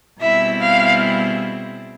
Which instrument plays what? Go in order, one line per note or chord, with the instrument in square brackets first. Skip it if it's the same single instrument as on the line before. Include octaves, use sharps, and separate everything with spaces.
[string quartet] B2 G3 C4 E4 G#4 [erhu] E5
[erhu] F5